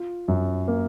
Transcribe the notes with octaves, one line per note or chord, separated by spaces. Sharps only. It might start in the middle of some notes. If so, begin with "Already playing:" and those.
Already playing: F4
F#2
A#3